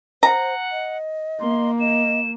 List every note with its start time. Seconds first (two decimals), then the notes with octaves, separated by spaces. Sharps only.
0.23 C5 F#5 A#5
0.72 D#5
1.40 A#3 C6
1.80 D#5 E7